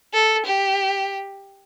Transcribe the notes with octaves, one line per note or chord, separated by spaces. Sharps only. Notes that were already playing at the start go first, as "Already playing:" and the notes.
A4
G4